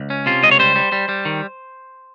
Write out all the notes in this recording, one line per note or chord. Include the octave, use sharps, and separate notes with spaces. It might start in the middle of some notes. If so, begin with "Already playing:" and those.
Already playing: C#2
C#4
C3 F4
C#2 D#5
C#5
G3 C5
G3
G3
G3
D#3